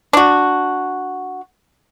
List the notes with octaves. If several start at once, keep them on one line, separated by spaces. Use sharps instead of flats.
D4 F#4